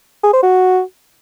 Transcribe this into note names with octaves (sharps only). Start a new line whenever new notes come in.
G#4
C5
F#4